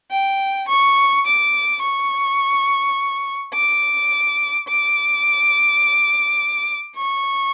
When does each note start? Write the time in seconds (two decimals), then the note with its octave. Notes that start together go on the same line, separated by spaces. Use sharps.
0.11 G5
0.68 C#6
1.26 D6
1.82 C#6
3.54 D6
4.68 D6
6.96 C#6